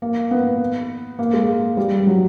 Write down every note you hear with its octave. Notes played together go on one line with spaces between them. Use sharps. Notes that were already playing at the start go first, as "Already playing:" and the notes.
A#3
B3
A#3
G#3
G3
G3
F#3